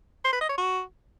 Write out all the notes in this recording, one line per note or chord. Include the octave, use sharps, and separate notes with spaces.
C5
B4
D#5
C#5
F#4